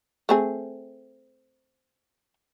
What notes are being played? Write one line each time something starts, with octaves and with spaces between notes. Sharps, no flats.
A3 C4 G#4